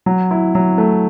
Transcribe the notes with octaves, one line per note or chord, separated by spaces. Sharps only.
F#3
E4
F#3
A3